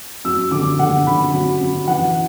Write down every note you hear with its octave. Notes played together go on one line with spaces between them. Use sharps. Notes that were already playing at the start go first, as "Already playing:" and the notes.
F#2 E6
D3 D6
D3 F#5
D3 B5
F#2
F#2
E3 F#5